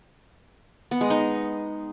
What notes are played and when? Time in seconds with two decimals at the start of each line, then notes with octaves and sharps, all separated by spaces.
0.91 B3
1.01 G#3
1.10 D#4